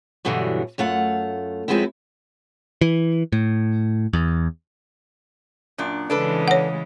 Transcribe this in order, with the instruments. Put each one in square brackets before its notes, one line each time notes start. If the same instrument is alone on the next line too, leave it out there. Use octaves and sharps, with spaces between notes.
[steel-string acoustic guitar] G2 B2 D3 E3 F#3 G3
F#2 A3 F4 F#5
F#2 F3 G#3 B3 C4 E4
[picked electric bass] E3
A2
E2
[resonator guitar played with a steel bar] F#2 A#2 D4
[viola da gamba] C#3 E3 G#3 [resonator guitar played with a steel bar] D4 A4 B4
[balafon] C#5 F#5